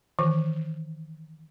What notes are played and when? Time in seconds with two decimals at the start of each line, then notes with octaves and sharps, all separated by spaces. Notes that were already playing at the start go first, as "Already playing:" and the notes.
0.19 D#3 E3